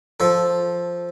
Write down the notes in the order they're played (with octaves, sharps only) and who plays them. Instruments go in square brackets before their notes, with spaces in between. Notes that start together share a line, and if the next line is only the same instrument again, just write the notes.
[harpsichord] F3 A4